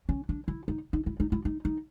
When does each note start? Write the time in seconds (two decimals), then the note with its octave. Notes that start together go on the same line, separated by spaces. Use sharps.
0.09 C#4
0.29 D4
0.48 E4
0.68 D#4
0.93 D#4
1.06 E4
1.20 D#4
1.32 E4
1.45 D#4
1.65 D#4